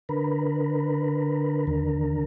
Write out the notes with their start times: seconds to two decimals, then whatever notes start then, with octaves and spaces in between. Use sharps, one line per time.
0.09 D3 A#4 B4
1.67 D#2 D3 A#4